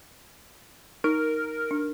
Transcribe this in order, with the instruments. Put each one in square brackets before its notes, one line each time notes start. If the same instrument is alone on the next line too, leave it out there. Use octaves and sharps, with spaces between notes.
[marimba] D#4 [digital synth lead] A#4
[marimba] D4